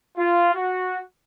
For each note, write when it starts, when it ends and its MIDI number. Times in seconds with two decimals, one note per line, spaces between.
0.18 0.50 65
0.54 1.01 66